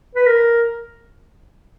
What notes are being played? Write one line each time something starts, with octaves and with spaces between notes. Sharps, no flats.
B4
A#4